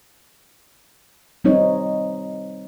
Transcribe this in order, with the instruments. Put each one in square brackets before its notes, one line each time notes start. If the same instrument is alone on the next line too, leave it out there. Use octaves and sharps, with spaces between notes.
[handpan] G3 C4 D#4 C#5